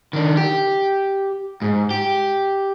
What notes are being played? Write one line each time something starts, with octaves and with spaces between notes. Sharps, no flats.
D#3 D4
G4
G#2
G4